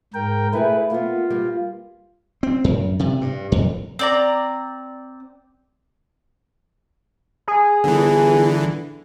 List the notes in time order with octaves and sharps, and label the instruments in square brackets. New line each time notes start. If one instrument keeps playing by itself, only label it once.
[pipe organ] G#2 A#4 G5
[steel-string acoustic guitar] A3 E4 G#4 [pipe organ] B4
[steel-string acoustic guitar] A#3 B3 [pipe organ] F4
[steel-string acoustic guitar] G3 A#3
[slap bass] C4
F#2
C3
G2
F2
[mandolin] C4 D5 A#5
[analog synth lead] G#4
[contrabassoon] G1 [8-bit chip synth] D3 E3